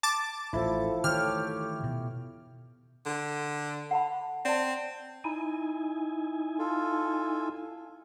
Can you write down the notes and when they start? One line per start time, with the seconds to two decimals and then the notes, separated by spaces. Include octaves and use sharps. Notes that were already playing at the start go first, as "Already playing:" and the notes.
0.03 A5 D6 A6
0.53 A1 F3 E4 A4
1.04 D#3 E3 A3 G4 C#5 F6
1.83 B2
3.06 D3
3.91 F#5 A5 B5
4.45 C4 D5 A5
5.24 D#4 E4 G#5
6.59 F4 A4